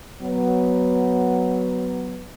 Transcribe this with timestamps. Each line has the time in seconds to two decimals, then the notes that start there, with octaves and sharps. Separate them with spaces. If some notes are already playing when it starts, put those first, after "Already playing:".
0.22 F#3 B3